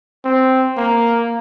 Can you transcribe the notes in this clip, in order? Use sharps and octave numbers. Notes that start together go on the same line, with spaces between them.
C4
A#3